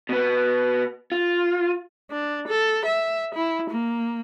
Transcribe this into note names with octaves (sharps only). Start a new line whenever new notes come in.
B2 B3
F4
D4
A4
E5
E4
A#3